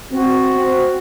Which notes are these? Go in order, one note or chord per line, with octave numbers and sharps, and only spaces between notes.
C4 F#4
C4